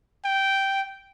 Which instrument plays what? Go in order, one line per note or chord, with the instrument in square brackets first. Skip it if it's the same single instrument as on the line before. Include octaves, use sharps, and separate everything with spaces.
[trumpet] G5